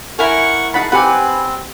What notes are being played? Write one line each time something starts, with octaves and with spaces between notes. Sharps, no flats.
E4 A#4 F#5 G#5 C#6
D#4 G#4 F#5 A5 B5
C4 G4 B4 F#5 G#5